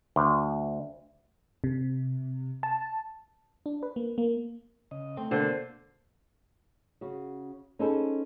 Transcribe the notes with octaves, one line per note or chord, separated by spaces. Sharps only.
D2
C3
A5
D4
B4
A#3
A#3
C#3 D#5
A3 C4
B2 D3 A#3 C5
C#3 F#4
C#4 D#4 G#4 A4 B4 C5